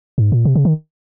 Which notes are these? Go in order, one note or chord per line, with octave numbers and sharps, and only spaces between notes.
G#2
A#2
C3
C#3
D#3